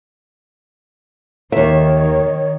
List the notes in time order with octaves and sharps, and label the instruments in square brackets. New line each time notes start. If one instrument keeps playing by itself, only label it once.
[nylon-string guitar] D#2 E5 [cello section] D#3 [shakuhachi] C#5